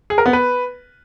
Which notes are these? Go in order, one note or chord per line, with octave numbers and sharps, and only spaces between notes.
G#4
A#4
B3
B4